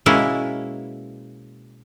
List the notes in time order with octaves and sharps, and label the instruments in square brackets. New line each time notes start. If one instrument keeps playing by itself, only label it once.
[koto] B2 G#3 A#3 C#4 E4